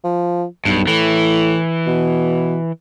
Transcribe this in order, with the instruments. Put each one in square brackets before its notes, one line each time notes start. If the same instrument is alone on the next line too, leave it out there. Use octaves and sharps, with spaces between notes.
[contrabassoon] F3
[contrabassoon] B1 [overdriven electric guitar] G2
[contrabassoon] A2 [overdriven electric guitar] E3
[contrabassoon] B2